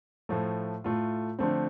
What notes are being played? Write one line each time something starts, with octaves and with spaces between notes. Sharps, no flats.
A2 F3 A3
A2 A3 F4
D3 F3 A3 C4